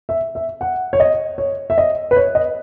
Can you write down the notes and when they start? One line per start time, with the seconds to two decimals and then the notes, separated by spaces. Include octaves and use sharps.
0.09 E5
0.35 E5
0.61 F#5
0.93 C#5
1.00 D#5
1.38 C#5
1.70 E5
1.78 D#5
2.11 B4
2.16 C#5
2.35 D#5